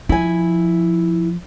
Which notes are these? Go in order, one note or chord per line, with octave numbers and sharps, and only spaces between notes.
F3 E4 G#5